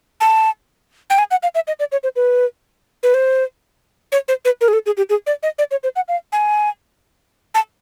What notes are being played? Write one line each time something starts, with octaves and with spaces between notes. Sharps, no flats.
A5
G5
G#5
F#5
F5
E5
D#5
D5
C#5
C5
B4
B4
C5
C#5
C5
B4
A#4
G#4
A4
G#4
G4
G#4
D5
D#5
D5
C#5
C5
F#5
F5
G#5
A5